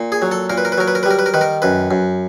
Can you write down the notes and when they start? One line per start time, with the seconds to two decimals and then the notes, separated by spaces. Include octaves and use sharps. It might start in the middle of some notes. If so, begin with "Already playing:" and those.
Already playing: A#2
0.12 G#4
0.22 F#3
0.31 A4
0.50 A#2 A#4
0.58 B4
0.65 A#4
0.72 B4
0.78 F#3 A#4
0.88 B4
0.95 A#4
1.03 B4
1.06 G3 A#4
1.19 B4
1.26 A#4
1.34 D#3 B4
1.41 A#4
1.62 F#2 B4
1.91 F#2